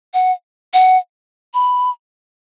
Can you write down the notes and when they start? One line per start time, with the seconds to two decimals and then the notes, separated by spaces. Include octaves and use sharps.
0.14 F#5
0.73 F#5
1.54 B5